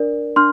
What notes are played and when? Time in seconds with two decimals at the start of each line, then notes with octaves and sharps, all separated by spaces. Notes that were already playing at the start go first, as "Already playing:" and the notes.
Already playing: D4 A#4 D5
0.36 D4 C6 F6